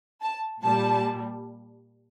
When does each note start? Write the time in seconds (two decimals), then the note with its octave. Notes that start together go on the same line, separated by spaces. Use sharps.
0.21 A5
0.62 A#2 G3 A5